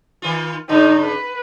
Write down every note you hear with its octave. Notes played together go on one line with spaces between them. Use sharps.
D#3 F4
G2 C#3 D#4
B4